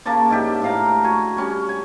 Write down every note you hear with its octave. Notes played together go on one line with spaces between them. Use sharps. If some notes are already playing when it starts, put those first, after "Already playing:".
C#3 A#3 A5 D6
G#2 D4 G4 E5
A2 F5 A#5
F#4 G#5
G3 C#4
G#5